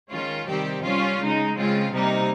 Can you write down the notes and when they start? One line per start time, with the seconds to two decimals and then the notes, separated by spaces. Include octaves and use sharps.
0.10 D#3 G#3 C#4 F4
0.46 C3 D#3 G3 C4 G4
0.83 G3 C#4 F4
1.18 C#3 G#3 D#4
1.55 C#3 G#3 C4 F4
1.91 C3 G3 A#3 D#4